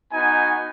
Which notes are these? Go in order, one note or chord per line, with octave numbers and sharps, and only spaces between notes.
B3 D#4 F#4 G#5